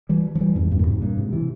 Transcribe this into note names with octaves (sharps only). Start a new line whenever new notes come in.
E3 G3
F3
E3 G3
F2 G#2
E2 G2
A#2
G#2 C3
G2 A#2
G#2 C3
C3 E3